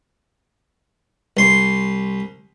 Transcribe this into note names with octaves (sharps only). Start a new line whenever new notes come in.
C2 C6